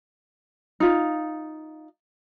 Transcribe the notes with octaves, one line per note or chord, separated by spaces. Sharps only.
D#4 F4